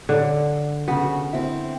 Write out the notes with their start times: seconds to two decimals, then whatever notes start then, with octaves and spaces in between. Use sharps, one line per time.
0.09 D3
0.88 C#3 B3 F#4
1.33 C4 E4